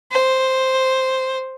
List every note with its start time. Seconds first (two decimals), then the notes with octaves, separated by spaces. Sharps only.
0.12 C5